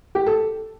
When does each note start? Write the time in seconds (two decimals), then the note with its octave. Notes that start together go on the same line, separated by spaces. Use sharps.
0.15 G4
0.26 A4